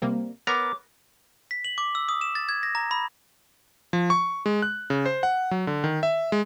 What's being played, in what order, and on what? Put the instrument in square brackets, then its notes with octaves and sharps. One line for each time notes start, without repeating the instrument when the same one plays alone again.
[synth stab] C3 G3 A#3
[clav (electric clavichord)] B3 A#4 A#5 [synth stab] C#5 [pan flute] D6
[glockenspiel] B6
F#7
D6
E6
D#6
E7
A6
G#6
A#6
A#5
B5
[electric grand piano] F3
C#6
G#3
F#6
C#3
C5
F#5
F#3
D3
D#3
E5
G#3